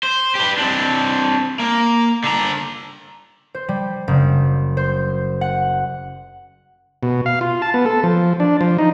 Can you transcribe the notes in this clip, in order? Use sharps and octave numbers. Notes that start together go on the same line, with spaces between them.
C5
G4 B4
C4 D4
A#3
D3 A#5
C5
G3
F#1
C5
F#5
B2
F5
F4
A5
B3
A4
F3
D4
F3
D#4